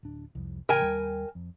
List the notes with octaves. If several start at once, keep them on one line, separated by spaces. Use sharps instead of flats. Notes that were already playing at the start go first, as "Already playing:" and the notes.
D1 D4
C2 F2
A1 C#3 A#4 G5 G#5
D#2 G3
F2